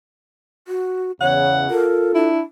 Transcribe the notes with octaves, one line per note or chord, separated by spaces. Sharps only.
F#4
E2 C#3 C#5 F#5
F4 A4 A#4
D4 E4